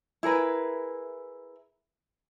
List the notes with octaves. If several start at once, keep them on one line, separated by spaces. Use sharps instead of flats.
E4 G#4 A#4 B4